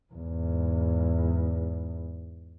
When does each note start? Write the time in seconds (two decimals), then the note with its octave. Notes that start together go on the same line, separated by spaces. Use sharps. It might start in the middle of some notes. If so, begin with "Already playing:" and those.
0.13 E2 G#2